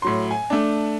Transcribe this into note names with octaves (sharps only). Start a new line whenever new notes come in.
A2 F#3 C6
G#5
A3 D4